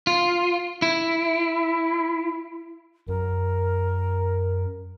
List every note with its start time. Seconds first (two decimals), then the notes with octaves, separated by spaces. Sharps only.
0.07 F4
0.82 E4
3.08 F#2 A#4